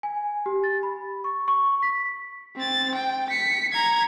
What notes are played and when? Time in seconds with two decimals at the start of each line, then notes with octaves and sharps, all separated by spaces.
0.03 G#5
0.46 G4
0.64 A6
0.83 B5
1.24 C#6
1.48 C#6
1.83 B6
2.56 C4 A6
2.95 G5
3.30 B6 C#7
3.73 A#5 G#6